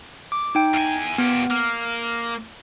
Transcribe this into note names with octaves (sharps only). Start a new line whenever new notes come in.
D6
D#4 G5
E2 G#5
A#2 B3 G4
A#3 F6